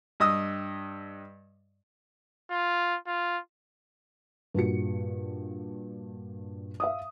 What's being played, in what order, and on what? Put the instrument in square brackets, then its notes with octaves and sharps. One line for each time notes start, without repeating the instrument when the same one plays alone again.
[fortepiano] G2 D#5 D#6 E6
[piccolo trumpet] F4
F4
[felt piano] G2 A#2 F#4 C#7
E5 F5 D#6